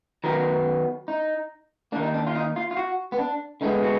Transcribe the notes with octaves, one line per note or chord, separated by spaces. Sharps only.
D#3 F#3 B3 A#4
D#4
D#3 A#3 D4
D#4
D4
F4
D#4
F4
F4
F#4
B3
D4
D3 G#3 B3 D#4
F#4